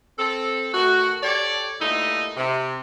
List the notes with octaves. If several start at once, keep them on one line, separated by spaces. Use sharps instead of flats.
C4 A4
D#3 A3 F#4
G4 A4 C#5 D5
G2 A#2 A3 D#4 E4
C3